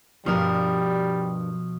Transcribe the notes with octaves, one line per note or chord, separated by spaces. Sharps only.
G2 B2 F3 G3 A#4